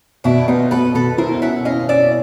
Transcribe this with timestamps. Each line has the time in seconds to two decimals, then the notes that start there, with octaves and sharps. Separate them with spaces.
0.24 B2 D4 E4
0.48 B3 D#4 F4
0.71 B3 A4 B4
0.94 B2 A4 B4
1.18 E4 A#4 C5
1.42 C#4 E5 F#5
1.65 C#4 D#5 F5
1.89 C#4 D5 E5